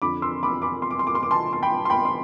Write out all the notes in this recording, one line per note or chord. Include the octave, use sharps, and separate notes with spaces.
F2 D3 F3 B5 D6
C6 E6
B5 D6
B5 D6
C6
D6
C6
D6
C6
D6
A5 C6
C6
G5 B5
C6
G5 B5
C6